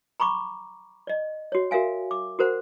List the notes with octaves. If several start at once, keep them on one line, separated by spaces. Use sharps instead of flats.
A#5 B5 C#6 D6
D5 D#5
F#4 C#5
F#4 A#4 E5 F5 G#5
D6
F#4 A#4 C5 F#5